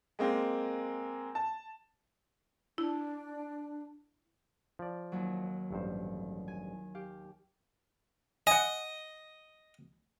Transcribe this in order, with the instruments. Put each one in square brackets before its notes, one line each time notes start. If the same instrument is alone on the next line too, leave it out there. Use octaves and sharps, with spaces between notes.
[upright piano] G#3 A#3 C4
A5
[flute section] D4 [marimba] E4
[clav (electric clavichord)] F3 D5
[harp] D#2 F#3
[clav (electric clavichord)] A1 G2 C5
[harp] G#5
[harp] G4 [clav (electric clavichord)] F5
[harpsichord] D#5 [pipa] F#5 G#5